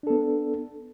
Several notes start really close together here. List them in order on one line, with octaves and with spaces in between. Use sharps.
D4 A4 B3